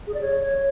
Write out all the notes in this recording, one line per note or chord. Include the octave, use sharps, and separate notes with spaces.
G#4
D5
C#5